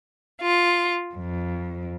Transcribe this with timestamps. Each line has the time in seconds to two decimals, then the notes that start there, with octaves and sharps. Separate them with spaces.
0.41 F4
1.14 F2